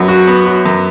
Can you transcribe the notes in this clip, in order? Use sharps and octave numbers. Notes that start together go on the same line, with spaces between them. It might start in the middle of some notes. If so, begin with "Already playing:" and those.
Already playing: F#2 F#3 B3
F#4
B3
F#3
F#2